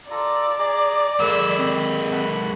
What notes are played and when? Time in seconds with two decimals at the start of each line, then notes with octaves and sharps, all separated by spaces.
0.11 F4 A4 D5 A#5
0.59 G#4 D#5 A#5
1.20 G#3 A#3 B5 E6
1.57 C4
2.12 F#5 A5 B5